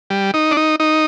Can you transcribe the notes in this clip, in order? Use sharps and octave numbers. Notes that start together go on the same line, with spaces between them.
G3
D#4
D4
D#4
D#4